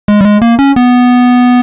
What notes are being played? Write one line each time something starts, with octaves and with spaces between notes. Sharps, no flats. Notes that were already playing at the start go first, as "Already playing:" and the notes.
G#3
G3
G#3
A#3
C#4
B3